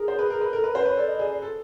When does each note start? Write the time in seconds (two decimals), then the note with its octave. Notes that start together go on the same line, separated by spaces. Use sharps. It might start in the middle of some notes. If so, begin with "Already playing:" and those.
Already playing: G#4 A#4
0.08 C5
0.19 B4
0.30 A#4
0.41 B4
0.52 A4 A#4
0.64 A#4 B4
0.75 B4 C5
0.86 B4 C#5
0.97 A4 D5
1.08 D#5
1.19 G#4 D5
1.42 A4